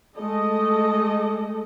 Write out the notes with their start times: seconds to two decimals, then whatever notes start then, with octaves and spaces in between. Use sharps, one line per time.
0.15 G#3 A3 A4 D#5